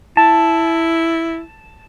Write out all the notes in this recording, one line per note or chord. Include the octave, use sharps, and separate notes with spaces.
E4 A5